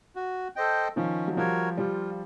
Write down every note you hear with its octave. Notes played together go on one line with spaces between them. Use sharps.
F#4
A4 C5 D#5 G5
D#3 F3 C#4
F#3
F3 G3 F#4 A#4 C#5
F3 G3 F4